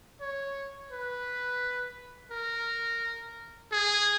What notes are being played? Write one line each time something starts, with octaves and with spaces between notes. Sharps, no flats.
C#5
B4
A#4
G#4